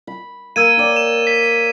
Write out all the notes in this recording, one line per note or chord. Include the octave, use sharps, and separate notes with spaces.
B5
A#3 E6 G#6 D#7
C#5 D5 G5
E7
B6